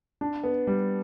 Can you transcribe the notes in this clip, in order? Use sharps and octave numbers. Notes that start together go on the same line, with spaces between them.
D4
B3
G3